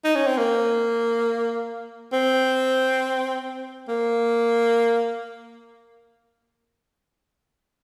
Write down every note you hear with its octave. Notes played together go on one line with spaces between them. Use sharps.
D#4
C#4
C4
A#3
C4
A#3